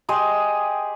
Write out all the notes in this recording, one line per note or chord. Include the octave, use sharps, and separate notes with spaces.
G4 G#4 D#5 C6